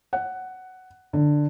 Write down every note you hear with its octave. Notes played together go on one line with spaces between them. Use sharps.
F#5
D3